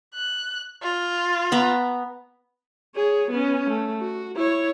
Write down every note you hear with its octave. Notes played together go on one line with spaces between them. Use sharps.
F#6
F4
B3 A#5 B5
G#4 C#5
B3 C#4
A3
F#4
E4 C#5